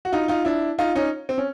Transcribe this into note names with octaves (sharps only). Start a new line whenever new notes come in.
F#4
D#4 F4
D#4 F4
D4 E4
D#4 F4
C#4 D#4
C4
C#4